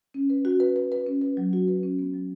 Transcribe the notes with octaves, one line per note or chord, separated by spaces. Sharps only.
C#4
B4
F#4
B4
B4
B4
C#4
B4
F#3
F#4
B4
C#4
B3
F#3